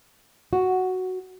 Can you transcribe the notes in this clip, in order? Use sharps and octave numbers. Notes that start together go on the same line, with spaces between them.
F#4